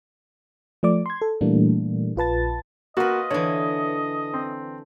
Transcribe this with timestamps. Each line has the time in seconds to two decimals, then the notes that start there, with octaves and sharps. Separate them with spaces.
0.83 F3 A3 D5 D6
1.06 C6 G#6
1.22 A4
1.41 A#2 E3 G3 A3 A#3 D4
2.16 A#1 F4 B4 A5 A6
2.97 A#3 F4 F#4 B4 D#5
3.30 D3 E3 C#5
4.34 C4